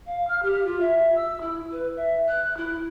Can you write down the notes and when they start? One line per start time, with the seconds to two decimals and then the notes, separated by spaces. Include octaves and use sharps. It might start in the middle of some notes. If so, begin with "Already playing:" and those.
0.06 F5
0.27 F6
0.42 G4
0.65 F4
0.80 E5
1.15 E6
1.41 E4
1.71 B4
1.96 E5
2.27 F#6
2.57 E4